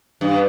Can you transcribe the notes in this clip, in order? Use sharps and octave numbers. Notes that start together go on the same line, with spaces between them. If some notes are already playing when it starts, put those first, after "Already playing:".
G2